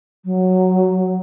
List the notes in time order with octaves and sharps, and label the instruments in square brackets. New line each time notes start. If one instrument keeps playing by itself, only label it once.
[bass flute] F#3